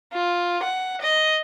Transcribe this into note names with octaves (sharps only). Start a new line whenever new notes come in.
F4
F#5
D#5